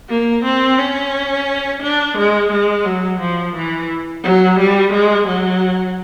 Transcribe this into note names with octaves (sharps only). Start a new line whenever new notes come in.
A#3
C4
C#4
D4
G#3
G#3
F#3
F3
E3
F#3
G3
G#3
F#3